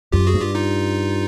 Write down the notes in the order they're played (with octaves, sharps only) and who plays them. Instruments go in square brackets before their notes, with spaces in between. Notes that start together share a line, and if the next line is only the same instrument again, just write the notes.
[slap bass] F#2 [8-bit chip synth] F4 G4
[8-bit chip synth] F#4 G#4
[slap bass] G2
[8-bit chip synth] F4 G4
D#4 F4